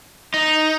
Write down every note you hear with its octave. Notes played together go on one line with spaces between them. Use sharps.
D#4